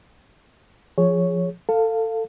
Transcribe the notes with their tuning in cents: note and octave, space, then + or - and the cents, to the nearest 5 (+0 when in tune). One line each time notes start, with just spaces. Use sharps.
F3 +0 G#4 +0 C#5 +0
A4 +20 F5 +0